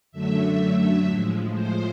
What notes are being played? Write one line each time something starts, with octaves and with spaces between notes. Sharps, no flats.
F#2 D3 F#3 A3 E5
A2 F3 G#3
C5